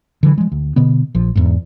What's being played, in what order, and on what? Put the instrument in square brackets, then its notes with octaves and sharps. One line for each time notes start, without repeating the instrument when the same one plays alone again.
[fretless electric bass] D3 E3 F#3
F3 G#3
D2
B2 D3 B3
A#1 F3
E2 G#2